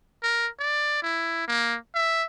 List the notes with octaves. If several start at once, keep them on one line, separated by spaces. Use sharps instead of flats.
A#4
D5
E4
A#3
E5